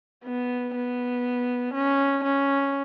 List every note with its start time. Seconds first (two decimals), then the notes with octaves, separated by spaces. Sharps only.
0.25 B3
0.75 B3
1.75 C#4
2.24 C#4